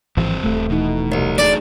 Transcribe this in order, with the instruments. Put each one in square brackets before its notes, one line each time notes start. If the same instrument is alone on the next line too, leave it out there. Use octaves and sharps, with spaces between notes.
[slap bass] G#1 E3 F3 [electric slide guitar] G2 C4
[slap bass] D#1 [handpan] A3
[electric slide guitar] B2 [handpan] E3 D#4
[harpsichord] C2
[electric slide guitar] F#3 D4 G#4 [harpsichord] D5